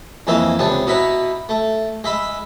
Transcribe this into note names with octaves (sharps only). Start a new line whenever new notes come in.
F2 E3 G#3 A#3 E5
C#2 C3 B3 D4
B2 B3 E4 A#5 B5
A3
G#3 E5 B5